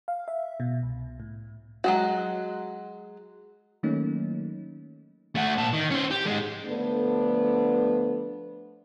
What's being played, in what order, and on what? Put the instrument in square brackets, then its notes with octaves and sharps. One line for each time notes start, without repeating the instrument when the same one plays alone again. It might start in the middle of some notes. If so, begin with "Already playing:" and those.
[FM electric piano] F5
E5
B2
C2
A2
[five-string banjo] F#3 G#3 F#4
[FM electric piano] D#3 F#3 A3 A#3 C#4 D#4
[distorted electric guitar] A3 F#4
A#2 A5
D#3
C#4 C5
G4
G#2 G#3
[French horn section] D3 F3 A3 B3 D4